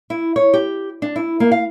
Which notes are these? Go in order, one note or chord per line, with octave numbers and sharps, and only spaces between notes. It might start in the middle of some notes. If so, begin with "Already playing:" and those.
E4
C#5
G4
D4
E4
A#3
F5